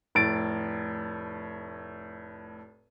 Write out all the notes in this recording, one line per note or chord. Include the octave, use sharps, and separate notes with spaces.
F1 A2 A6 D7